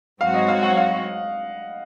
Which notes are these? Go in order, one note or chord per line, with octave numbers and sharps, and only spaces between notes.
G#2 F#3 C4 F#4 C#5 F5
D#5
F5
F#5
F5